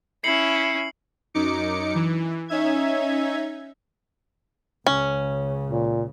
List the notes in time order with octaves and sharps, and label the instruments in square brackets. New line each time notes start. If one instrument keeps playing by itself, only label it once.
[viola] C#4 E4 [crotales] C7 C#7 F#7
[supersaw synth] F#2 D#4 D6 C#7
E3
C#4 D#4 E5 G#6
[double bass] C#2 C#3 [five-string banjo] C#4
[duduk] A#2